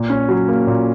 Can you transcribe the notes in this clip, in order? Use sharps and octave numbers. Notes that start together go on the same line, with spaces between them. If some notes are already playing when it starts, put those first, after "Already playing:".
Already playing: A#2
C#4
F#3
A#3
A#2